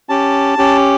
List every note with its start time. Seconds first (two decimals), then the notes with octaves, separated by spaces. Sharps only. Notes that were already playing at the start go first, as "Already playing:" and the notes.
0.09 C#4 G4 A5
0.58 C#4 G4